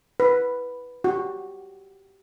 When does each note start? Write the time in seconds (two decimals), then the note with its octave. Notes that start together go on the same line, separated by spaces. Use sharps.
0.20 B4
1.04 F#4 G4